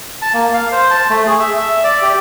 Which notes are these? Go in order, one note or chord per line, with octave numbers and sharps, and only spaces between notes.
A5
A#3
F5
C5
A5
A3
G#4
E5
E5
D5
G4